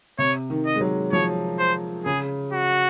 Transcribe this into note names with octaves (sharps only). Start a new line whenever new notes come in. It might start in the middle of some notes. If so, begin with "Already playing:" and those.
C3 C#5
D#3
D#5
G#3
F#3
F3 C#5
C5
C#3 G#4
F#4